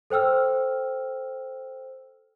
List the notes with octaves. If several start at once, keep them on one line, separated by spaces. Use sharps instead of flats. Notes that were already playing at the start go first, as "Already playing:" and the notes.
A4 C5 G5 E6 F6